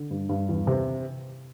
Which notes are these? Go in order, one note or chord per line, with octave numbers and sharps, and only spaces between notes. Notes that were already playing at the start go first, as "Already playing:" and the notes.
Already playing: D3
G2
G2
E2
C3